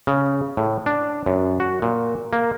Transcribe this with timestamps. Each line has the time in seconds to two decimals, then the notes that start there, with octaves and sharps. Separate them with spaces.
0.07 C#3
0.57 A2
0.86 D4
1.26 F#2
1.60 F#4
1.82 A#2
2.33 A#3